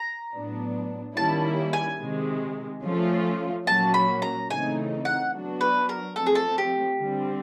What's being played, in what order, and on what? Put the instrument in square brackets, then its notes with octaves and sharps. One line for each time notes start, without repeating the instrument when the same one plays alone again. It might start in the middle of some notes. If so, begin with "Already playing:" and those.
Already playing: [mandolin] A#5
[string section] A2 F#3 B3 D4
[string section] D#3 G3 A#3 C#4 E4 [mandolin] A5
[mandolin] G#5
[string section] C3 D#3 G#3
F3 A3 C#4 F4
[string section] A#2 F#3 A#3 C#4 F#4 [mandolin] A5
[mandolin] B5
A#5
[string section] C#3 E3 A3 C4 D#4 [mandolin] G#5
[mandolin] F#5
[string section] F#3 B3 D4 F#4
[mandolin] B4
A#4
[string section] F3 A3 C4 [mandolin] A4
[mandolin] G#4
A4
G4
[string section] D3 G3 C4